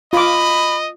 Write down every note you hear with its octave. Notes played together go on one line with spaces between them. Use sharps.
F4 D#5 B5 D6